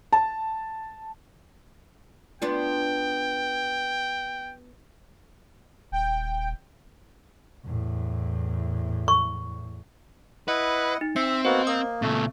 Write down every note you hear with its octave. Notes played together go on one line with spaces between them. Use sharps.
A5
B3 D4 F4 G5
D#1 G5
E2 A2
C#6
E4 B4 D#5 F#5
D#4
C4 E5 C#7
A#3 B3 F#4 C5 D#5
A#3 D#6
C#2 A#2 A3 C4